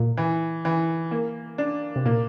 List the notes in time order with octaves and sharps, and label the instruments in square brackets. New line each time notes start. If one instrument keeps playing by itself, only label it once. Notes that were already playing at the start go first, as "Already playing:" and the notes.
Already playing: [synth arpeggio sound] A#2
[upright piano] E3
E3
A#3
D4
[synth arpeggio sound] C3
[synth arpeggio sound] A#2 [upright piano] A#3